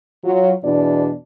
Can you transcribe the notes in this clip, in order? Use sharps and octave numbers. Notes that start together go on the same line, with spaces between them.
F#3 F4
E2 B2 D4 D5